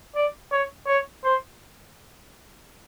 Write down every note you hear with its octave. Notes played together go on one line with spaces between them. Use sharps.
D5
C#5
C#5
C5